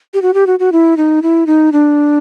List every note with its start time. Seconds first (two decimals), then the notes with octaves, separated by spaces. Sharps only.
0.14 G4
0.22 F#4
0.34 G4
0.47 F#4
0.59 F#4
0.72 E4
0.97 D#4
1.23 E4
1.47 D#4
1.72 D4